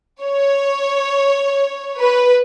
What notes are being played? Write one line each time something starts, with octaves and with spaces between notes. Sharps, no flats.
C#5
B4